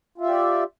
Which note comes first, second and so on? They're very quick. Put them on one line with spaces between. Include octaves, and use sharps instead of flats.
F4 E5 G4 D5